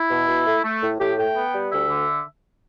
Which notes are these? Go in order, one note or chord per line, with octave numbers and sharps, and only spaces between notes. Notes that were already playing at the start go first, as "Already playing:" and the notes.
Already playing: E4
B2
B2
A3
A3
A2
A2 G4
A3 G5
B3
G3
D2 E5
D3